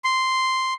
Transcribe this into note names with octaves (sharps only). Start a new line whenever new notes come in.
C6